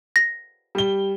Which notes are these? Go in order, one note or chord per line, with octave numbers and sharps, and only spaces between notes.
A#6
G3 G7